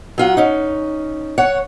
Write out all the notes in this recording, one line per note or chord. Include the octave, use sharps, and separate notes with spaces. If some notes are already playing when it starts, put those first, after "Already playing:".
F#3 F4 F#5
C#4 D#4
C#5 F#5